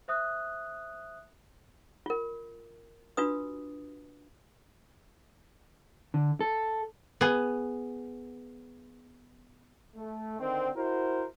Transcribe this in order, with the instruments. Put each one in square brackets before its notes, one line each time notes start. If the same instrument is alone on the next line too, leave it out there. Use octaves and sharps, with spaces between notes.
[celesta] C5 E5 D#6 F#6
[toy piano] F4 A#4
D4 F4 F#4 B4 D#6
[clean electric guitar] D3
A4
[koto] B3 G#4
[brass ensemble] A3
D3 D#3 C4
E4 F#4 A#4 C5